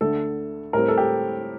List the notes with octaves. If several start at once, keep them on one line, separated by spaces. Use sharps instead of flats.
D2 D3 A3 A4
A2 G3 C4 A#4
A4
G4